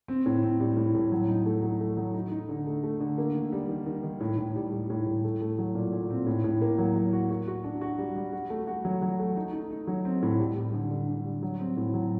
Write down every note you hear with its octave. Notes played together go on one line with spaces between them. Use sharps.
C4
A2
C4
G3
A2
A2
F#3
D#4
A3
F#3
A3
F#3
D#4
D#4
D3
A3
A3
D3
A#3
D#3
G3
D#3
D#3
D#3
A2
A2
G3
G3
A2
A2
A3
A3
F#3
A#2
A#2
C4
A2
A2
A#3
F#3
F#3
F#4
F#4
F#4
D4
F#4
G3
G3
F#4
A3
F#4
F#3
F#3
A3
D#4
D#4
D#4
F#3
C4
A2
G3
G3
D3
D3
D3
G3
F#3
C4
A2
F#3